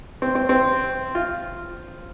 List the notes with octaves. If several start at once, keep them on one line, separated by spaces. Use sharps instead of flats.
C4
C4
C4
F4